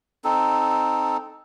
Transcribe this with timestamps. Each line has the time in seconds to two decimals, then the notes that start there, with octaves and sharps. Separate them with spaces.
0.24 C4 D#4 A4